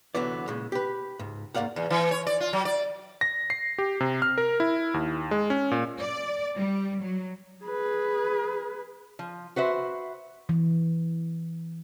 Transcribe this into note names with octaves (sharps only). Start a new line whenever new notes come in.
C2 D3 E3 F#3 B3 D5
A#2 C#3 G#3
G4 B4
C#2 G#2
D#2 G#2 A#3 D5 F5 F#5
E2
E3
C#5
D5
F4
F#3
D5
A#6
C7
G4
C3
F6
A#4
E4
D#2
G#3
C#4
A#2
D5
G3
F#3
G#4 B4
F3
F#4 B4 C5 E5
E3